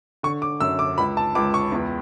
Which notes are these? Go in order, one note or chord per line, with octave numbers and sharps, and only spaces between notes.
D3 C#6
D6
F#2 E6
D6
C#2 B5
A5
C#2 D6
C#6
E2